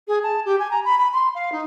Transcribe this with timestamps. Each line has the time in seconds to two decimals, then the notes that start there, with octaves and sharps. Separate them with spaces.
0.08 G#4
0.23 A5
0.45 G4
0.59 G#5
0.71 A#5
0.85 B5
0.98 B5
1.13 C6
1.35 F5
1.52 D#4